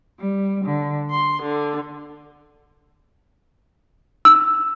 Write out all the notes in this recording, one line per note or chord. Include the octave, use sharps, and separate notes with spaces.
G3
D3
C6
D3
E6